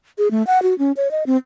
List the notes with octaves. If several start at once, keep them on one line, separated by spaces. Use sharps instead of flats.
G#4
A3
F#5
F#4
C#4
C#5
D#5
C4